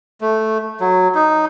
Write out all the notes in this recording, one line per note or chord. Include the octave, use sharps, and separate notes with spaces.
A3
F#3
D#4